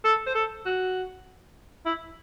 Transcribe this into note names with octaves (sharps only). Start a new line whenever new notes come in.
A4
C5
A4
F#4
E4